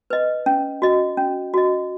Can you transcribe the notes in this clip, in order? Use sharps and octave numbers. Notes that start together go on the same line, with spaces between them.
B4 D#5
C#4
F#4 D#5
C#4
F#4 D#5